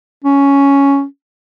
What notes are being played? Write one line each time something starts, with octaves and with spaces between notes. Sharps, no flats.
C#4